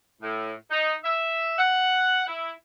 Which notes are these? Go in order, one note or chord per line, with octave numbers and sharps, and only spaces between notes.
A2
D#4
E5
F#5
E4